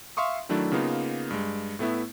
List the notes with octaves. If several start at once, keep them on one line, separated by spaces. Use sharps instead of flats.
E5 F5 C6 C#6 D#6
D#3 F#3 A3 D4 E4
C#3 A#3 B3 D#4 F4
G2 G#3
A2 A3 B3 E4